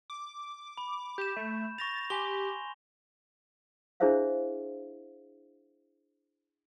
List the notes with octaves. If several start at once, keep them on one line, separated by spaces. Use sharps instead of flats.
D6
B5
G4 G6 E7
A3
C#6 A6 A#6 F7
G4 G#5 C6 G7
D4 E4 G#4 C5 E5 F5